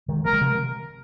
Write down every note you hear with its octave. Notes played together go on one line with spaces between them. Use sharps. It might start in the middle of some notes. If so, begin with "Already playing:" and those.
D#3 G#3
F3 A#3 A#4
D#3 G#3
C3 F3